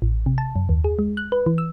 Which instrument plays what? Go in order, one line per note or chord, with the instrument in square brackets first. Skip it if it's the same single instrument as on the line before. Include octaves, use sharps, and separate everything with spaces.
[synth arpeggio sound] A1
C3
A5
F#2
D#2
G#4
G#3
F#6
B4
E3
E6